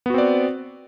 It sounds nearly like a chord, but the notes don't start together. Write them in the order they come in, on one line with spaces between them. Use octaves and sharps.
B3 F#4 C4 D5